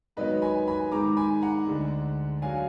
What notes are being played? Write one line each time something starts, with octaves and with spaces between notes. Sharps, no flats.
G#2 D#3 F#3 B3 B4 D#5
G#5 B5
G#5 B5
G#2 D#3 G#3 A#5 D6
G#5 B5
F#5 A#5
D2 D3 G#3 D4
D3 F#3 D4 F5 G#5